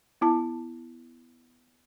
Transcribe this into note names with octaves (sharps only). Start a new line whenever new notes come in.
B3 E4 A5